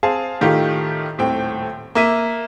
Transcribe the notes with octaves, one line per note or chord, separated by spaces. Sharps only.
C4 G#4 F5 A5
A2 D#3 A3 F4 G4
D#1 A2 C4 G5
A#3 E5 D#7